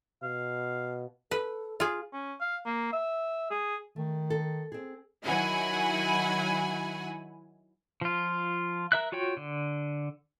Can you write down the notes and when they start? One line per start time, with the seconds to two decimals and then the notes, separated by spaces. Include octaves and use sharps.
0.23 B2 F5
1.31 A4 B4
1.80 F4 G#4
2.13 C#4
2.41 F5
2.66 A#3
2.92 E5
3.50 G#4
3.96 D#3 A3
4.30 A4
4.72 C4 G#4
5.25 D#3 F#3 E4 F#5 G#5 B5
8.01 F3 F4
8.92 A#4 E5 F#6
9.12 F4 F#4 C#5 G5
9.37 D3